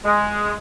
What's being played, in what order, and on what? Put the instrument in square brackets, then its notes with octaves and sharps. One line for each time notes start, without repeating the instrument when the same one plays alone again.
[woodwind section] G#3